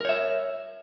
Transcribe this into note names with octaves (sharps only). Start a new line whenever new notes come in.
A#4 C#5 E5